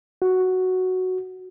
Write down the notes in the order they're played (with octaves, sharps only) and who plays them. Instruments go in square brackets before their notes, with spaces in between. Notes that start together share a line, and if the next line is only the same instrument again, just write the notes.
[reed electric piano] F#4